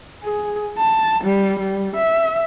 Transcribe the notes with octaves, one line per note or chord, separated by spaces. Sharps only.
G#4
A5
G3
G3
E5